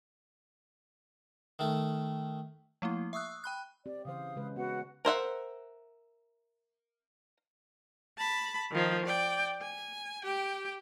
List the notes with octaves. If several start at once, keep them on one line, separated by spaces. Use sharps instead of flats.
D#3 A3
F3 A3 A#3 E4
E5 C#6 D#6 E6 F#6
G5 B5 F#6
C4 G4 D5
C#3 E3 C5 F5 D#6
C#3 G#3 B4
B3 F#4 B4 F#5
A#4 C5 E5 F#5
A5 B5
D#3 F3
D5 G5
G#5
G4 G5